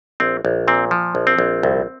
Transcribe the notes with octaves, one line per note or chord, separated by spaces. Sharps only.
A#1 C4
A#1
A#2 C4
F3
A#1
C4
A#1
C2